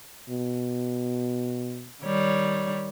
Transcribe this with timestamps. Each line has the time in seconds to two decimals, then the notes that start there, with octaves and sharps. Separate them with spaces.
0.30 B2
2.04 D#3 G3 C#5